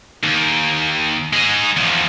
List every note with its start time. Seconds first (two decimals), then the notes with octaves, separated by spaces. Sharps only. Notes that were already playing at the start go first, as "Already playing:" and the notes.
0.24 D#2
1.33 G#3 D#4
1.77 E2 F3